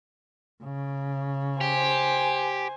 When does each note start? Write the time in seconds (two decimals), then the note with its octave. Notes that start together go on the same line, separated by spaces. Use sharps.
0.63 C#3
1.61 G4 C5 G#5